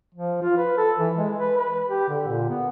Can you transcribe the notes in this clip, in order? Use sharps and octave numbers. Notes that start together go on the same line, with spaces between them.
F3
F4
B4
A4
E3
G#3
B4
B4
G4
D3
A#2
B3